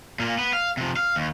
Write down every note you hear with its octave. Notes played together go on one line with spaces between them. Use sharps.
A#2 A#3
B3
F5
C3 F3
F5
D#2